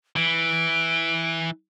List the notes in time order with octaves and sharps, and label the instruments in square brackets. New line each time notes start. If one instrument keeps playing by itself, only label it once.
[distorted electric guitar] E3 [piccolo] D7